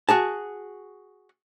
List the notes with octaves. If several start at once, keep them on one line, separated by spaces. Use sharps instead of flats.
F#4 G#4 A5